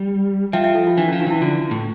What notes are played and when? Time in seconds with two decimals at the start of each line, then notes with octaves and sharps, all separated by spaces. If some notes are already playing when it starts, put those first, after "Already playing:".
Already playing: G3
0.53 F3 E5 G5
0.64 E5 G5
0.75 A4
0.87 F4
0.97 E3 D4
1.08 C#4
1.13 F3
1.20 D4
1.27 E3 E4
1.41 D3 F4
1.71 A2